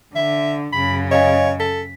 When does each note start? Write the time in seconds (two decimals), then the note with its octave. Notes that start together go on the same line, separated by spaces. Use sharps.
0.16 D3 E5
0.73 F#2 C#3 B5
1.11 C#5 D#5 F5 G#5
1.60 A4 B6